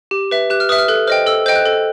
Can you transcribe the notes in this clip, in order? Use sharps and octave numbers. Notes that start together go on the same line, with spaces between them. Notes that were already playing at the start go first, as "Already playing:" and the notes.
G4
B4 E5
G4 F#6
F6
B4 E5 D#6
F6
A4 F#6
C5 D#5 G5 F6
A4 E6
C5 D#5 G5 G6
F#6
A4